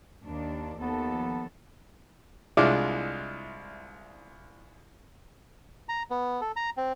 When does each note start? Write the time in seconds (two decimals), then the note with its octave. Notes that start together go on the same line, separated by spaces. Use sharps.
0.25 D#2 D4
0.80 D#2 F3 B3 A4
2.57 C2 G#3 D4 E4 F4 D6
5.89 A#5
6.10 B3
6.41 A4
6.56 A#5
6.77 C4